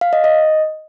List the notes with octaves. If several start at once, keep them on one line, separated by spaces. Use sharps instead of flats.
F5
D#5
D#5